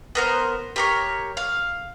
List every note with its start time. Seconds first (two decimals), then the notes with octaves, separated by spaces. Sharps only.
0.15 B3 A#4 C5
0.76 G4 A#4 C#5
1.37 F5